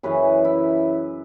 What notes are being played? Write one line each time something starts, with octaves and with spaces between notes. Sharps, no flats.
F#2 C#3 E3 B4
E4